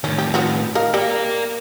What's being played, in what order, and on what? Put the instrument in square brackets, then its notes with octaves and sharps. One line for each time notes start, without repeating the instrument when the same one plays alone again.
[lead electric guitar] A2 D#3 [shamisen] C#4
[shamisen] G4
B3 F4 F#4
D#3 A#4 F5
[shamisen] G3 [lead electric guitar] A#4 F5